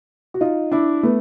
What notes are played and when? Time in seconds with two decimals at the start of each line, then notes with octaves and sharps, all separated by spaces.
0.34 F#4
0.41 D#4 F4
0.72 D4 E4
1.03 A3 B3